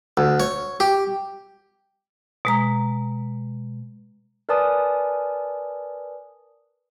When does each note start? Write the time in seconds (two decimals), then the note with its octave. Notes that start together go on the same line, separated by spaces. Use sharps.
0.17 D2
0.40 C#5
0.80 G4
2.45 B2 G#3 A#5
4.49 A#4 B4 D5 G#5 A5 D#6